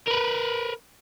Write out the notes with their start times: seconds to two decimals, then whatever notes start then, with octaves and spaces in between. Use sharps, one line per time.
0.07 A#4 B4